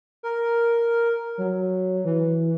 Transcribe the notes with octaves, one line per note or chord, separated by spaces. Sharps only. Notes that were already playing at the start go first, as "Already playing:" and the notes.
A#4
F#3
E3